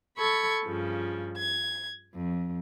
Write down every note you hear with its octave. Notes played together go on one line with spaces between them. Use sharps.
A4 B5 C#6 G#6
G2 C#3 F3
G#6
F2